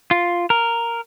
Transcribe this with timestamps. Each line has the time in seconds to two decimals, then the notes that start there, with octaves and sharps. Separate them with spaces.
0.11 F4
0.50 A#4